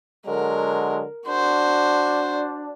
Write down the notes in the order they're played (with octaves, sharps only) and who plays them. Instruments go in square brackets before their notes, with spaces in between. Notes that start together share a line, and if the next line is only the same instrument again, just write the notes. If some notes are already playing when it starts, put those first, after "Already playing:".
[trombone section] D3 F#3 G#3 [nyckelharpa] A#4
[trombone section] D4 [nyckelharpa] F#4 C5